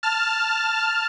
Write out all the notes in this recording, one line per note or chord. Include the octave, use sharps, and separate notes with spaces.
A5 F6